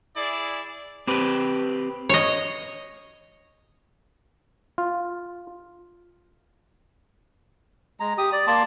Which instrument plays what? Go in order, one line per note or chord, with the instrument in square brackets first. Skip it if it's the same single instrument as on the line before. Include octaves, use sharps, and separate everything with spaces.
[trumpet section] E4 G#4 D5
[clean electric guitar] C4 G4 B4
[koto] C#5 D#5
[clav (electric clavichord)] F4
[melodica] G#3 A#5
G4 D#6
D5
A#3 D5 A5 C6